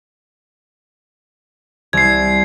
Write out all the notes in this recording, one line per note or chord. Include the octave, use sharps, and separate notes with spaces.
C2 G#6 C7